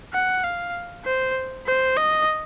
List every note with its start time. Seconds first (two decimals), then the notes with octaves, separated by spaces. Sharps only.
0.14 F#5
0.44 F5
1.05 C5
1.66 C5
1.97 D#5